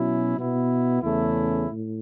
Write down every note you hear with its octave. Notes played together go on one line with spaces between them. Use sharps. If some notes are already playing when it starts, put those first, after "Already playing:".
Already playing: B2 F#3 C#4 E4
B2 B3 E4
E2 C#3 A3 C#4 E4
A2